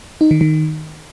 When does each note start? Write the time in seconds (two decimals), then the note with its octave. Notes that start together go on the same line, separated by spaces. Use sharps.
0.21 D#4
0.31 D#3
0.41 D#3